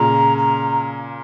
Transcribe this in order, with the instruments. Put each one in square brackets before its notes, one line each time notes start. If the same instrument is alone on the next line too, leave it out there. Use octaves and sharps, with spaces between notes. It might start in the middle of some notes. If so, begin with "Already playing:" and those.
Already playing: [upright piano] A#2 C#3 [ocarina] A#5
[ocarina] A#5